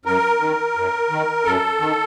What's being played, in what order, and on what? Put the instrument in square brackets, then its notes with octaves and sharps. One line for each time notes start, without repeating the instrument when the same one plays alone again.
[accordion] F#2 A#4
D#3
F#2
D#3
F#2 A4
D#3